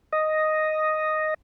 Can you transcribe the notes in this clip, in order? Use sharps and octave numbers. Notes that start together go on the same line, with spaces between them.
D#5